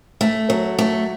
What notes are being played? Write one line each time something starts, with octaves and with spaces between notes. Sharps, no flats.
A3
F#3
A3